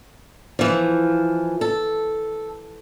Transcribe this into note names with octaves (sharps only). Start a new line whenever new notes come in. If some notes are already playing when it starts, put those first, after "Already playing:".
E3 F3
A4